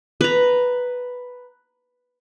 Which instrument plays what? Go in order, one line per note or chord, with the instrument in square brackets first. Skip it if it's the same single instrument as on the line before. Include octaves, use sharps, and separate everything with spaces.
[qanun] B4 A#5